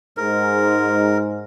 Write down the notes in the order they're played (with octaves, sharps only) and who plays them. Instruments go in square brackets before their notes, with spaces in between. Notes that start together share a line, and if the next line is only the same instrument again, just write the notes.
[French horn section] G#2 [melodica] A#4